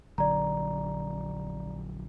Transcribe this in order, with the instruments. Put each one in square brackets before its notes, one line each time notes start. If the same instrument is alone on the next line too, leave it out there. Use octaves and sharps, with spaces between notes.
[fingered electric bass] A#1 D3 F#3 [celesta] D5 A#5